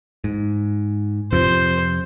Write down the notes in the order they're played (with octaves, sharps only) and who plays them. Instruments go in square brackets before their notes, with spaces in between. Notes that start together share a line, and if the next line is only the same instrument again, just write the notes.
[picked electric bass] G#2
[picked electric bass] F2 C3 F3 [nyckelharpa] C5